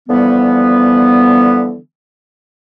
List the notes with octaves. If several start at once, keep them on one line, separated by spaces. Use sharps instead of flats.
D3 E3 F3 G3 B3